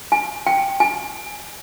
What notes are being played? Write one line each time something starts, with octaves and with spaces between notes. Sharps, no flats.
G#5
G5
G#5